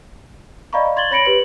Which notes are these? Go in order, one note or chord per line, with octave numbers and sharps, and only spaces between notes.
D5 D#5 F5 A#5 B5 C#6
C6 G#6 A6 F#7 G7
C#5 B5 A#6 C#7 D7 F#7
G4 B4 F#7